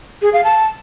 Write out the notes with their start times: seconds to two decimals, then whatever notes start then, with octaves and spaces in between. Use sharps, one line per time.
0.22 G#4
0.33 F5
0.44 A5